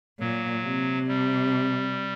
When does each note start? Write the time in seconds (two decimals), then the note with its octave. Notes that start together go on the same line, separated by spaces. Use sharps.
0.20 A#2 F#3
0.63 C3
1.08 G3